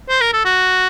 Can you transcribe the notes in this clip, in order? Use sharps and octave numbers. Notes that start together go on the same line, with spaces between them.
C5
A#4
A4
F#4